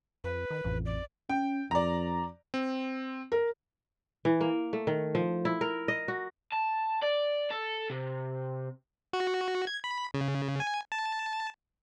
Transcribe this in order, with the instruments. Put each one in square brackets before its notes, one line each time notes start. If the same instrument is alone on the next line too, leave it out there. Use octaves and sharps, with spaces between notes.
[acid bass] F2 [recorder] B4
[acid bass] D#3
[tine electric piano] A1 [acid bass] F2
[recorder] D5
[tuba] C#4 [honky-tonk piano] G5
[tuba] F2 [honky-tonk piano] D5 A#5
[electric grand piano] C4
[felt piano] A#4
[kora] E3
A#3
A3
D#3
F3
E4
A#4
D#5
F#4
[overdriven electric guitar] A5
D5
A4
C3
[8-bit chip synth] F#4
G#6
B5
C#3
G#5
A5